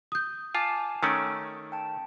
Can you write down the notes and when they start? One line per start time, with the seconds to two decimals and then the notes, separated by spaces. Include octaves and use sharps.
0.12 D#6 G6
0.55 F4 G#5 A5 D6
1.03 D#3 A3 C#4 E6 D7
1.72 G5 A5